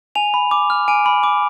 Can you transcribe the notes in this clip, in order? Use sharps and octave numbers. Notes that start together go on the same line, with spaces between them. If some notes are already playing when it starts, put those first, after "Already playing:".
G#5 F7
B5
D6
F6
G#5 D7
B5
D6